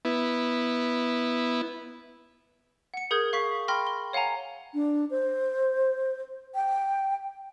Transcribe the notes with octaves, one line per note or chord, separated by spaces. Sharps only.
B3 E4
F#5 C#7
G#4 A#4 D#6 G6 G#6
F5 C#6 B6
G5 B5 C6 F6 A#6
G7
C#5 F5 F#5 G#5 A#5
D4
C5
G5